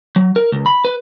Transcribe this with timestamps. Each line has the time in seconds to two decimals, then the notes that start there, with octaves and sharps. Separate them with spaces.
0.16 F#3
0.36 A#4
0.52 C#2
0.66 B5
0.85 B4